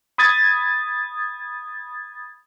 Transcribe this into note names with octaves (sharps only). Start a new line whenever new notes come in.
B5 D#6 G#6 A6